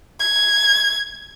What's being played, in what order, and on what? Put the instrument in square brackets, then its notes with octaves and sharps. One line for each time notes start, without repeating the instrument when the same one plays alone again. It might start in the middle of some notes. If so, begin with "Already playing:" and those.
[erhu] G#6